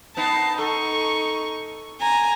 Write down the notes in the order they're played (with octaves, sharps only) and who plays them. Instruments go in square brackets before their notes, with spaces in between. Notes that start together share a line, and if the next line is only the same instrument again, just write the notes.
[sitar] B3 D#4 [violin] A5 C7
[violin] D#4 C#6 [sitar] A4
[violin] G#5 A#5